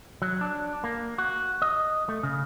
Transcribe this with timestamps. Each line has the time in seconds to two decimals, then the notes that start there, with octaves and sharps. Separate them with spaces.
0.22 F#3
0.41 D4
0.84 A#3
1.18 F#4
1.62 D#5
2.09 A3
2.23 C#3